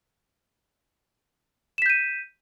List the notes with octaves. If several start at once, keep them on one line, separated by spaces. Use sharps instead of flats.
G6 B6 D#7 E7